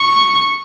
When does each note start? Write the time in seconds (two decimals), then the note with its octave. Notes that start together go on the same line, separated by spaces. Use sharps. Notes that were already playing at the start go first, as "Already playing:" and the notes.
Already playing: C#6